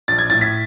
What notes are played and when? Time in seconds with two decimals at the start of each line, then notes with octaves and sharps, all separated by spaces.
0.08 A#1 A6
0.19 G#6
0.30 A2 A6
0.41 B6